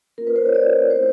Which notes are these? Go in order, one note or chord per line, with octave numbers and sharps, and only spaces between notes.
A#3 C#4 F4 A#4
B4
C5
C#5
D5
A3 C4 E4 C5